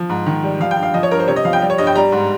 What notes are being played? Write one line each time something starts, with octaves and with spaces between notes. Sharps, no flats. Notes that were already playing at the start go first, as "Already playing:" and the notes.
Already playing: F3
G#2
D#3
G3
F3 F5
G5
G2
F5
F3 D#5
C#5
G2 A#4
C5
C3 C#5
D#5
F3 F5
G5
G3
C#5
G2 D#5
G5
G3 A#5
G#2